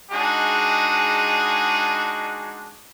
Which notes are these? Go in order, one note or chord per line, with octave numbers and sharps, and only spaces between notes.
G#3 D4 D#4 F#4 G#4